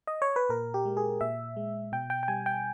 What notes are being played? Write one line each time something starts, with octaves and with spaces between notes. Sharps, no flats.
D#5
C#5
B4
A#2 A#4
G4
G#3
G#4
A#2 E5
G#3
B2 G5
G5
G5
G3 G#5
G5